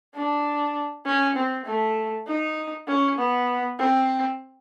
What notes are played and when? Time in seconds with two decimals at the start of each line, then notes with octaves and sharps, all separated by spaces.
0.15 D4
1.05 C#4
1.36 C4
1.65 A3
2.27 D#4
2.87 C#4
3.18 B3
3.79 C4